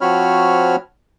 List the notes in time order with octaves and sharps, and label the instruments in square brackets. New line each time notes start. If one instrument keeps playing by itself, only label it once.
[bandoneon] F3 C4 F#4 C#5 B5 F6